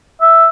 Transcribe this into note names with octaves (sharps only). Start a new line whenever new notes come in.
E5